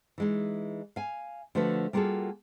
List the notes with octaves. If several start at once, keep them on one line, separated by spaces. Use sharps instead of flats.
E3 G#3 D#4
F5 G#5
D3 F3 A3 F#4 B4
G3 A#3 F4 F#4 G#4 A4